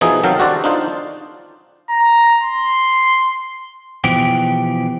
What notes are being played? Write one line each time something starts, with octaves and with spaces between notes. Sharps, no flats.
B2 E3 F3 D#4 G#4 A4
C2 D#3 F#3 A4 F5 G5
D4 F#4 G4 A4 C5 D5
D4 D#4 F4 C5
A#5
C6
B2 E3 F3 G4